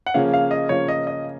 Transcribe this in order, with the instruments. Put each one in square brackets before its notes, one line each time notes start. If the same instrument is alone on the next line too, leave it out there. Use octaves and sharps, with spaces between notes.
[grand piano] F#5
[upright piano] C#3 F3 A#3 C#4 [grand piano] F5
[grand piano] F5
D#5
[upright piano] C#3 F3 A#3 C#4 [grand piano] C#5
[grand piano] D#5
D#5